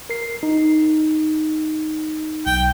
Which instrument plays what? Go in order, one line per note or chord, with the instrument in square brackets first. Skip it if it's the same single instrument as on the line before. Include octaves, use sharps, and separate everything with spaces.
[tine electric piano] A#4 C7
D#4
[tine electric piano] B1 [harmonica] G5